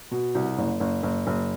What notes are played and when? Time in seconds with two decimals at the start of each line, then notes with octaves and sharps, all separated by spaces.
0.11 B2
0.35 C2
0.58 F#1
0.80 F#1
1.03 F#1
1.27 F#1